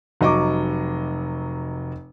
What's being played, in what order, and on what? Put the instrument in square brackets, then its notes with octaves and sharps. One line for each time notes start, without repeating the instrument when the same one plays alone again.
[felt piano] F1 F#3 D#5 C#6 D6